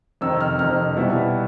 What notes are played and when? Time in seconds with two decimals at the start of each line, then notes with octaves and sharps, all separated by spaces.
0.21 F2 C3 D#3 E6
0.41 F6
0.59 F2 C3 D#3 F6
0.96 B2 G3 B3 E4